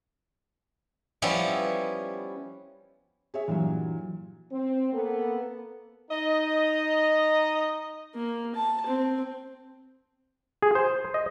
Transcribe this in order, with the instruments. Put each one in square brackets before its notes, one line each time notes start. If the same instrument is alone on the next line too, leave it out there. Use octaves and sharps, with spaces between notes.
[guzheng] F3 G3 B3 C#4 E4
[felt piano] G#4 C#5 E5
[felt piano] G2 A#2 [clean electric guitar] E3 F#3
[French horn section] C4
A#3 B3 A4
[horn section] D#4 D#5
[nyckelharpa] A#3
A5
C4
[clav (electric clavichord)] G#4
C5
D#5